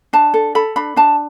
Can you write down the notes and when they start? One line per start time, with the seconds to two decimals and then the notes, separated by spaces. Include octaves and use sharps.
0.13 D4 A5
0.34 A4
0.55 A4 B5
0.76 D4 B5
0.96 D4 A5